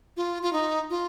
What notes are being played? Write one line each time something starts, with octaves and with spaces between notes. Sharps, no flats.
F4
F4
D#4
F4